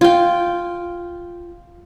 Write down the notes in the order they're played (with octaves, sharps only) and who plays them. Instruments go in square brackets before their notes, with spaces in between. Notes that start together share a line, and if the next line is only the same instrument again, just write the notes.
[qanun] F4 G5